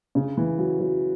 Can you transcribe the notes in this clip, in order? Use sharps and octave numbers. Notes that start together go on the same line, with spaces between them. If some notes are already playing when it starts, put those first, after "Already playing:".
C#3
E3
F#3
F#3